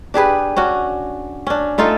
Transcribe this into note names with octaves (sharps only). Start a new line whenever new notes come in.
D4 G4 G#4 B4
C#4 D4 F#4
C#4 D4
A3 D#4 F4 A4